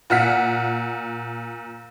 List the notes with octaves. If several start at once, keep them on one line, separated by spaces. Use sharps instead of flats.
A#2 F#5 F6 B6